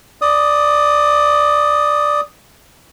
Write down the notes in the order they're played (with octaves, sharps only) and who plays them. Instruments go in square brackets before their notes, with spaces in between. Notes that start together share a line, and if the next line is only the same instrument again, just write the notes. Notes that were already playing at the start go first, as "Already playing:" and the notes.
[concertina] D5 D#6